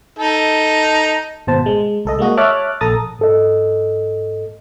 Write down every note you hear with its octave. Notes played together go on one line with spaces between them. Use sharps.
D#4 A4
G#1 B2 C5 A5
G#3
C2 A4 D#5
G#3 A#3 F#4 D#5
C#5 E5 A5 D6 F6 F#6
A#1 A4 A#5 D#6 A6
G#2 A4 D#5